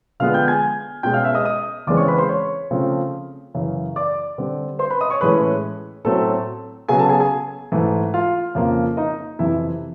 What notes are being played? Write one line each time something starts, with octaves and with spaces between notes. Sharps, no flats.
D3 F3 G#3 B3 F5 F6
G5 G6
G#5 G#6
B2 G#3 C#4 G5 G6
F5 F6
E5 E6
D#5 D#6
D#5 D#6
E2 C#3 E3 G#3 C4 D5 D6
C#5 C#6
B4 B5
C5 C6
C#5 C#6
C#3 F3 A3 C4
F#2 C#3 E3
D5 D6
D3 G3 C4
C5 C6
B4 B5
D#5 D#6
C#5 C#6
A2 E3 G#3 C#4 B4 B5
A2 F#3 A3 C4 A4 A5
C#3 F#3 B3 G#4 G#5
A4 A5
G#4 G#5
G#4 G#5
G#2 E3 A3
F4 F5
F2 C#3 F3 A#3
D#4 D#5
F2 C3 E3 E4 E5